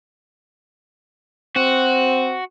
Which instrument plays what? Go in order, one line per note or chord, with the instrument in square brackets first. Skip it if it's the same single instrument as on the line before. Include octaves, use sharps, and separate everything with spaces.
[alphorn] C4 [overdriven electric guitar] F#4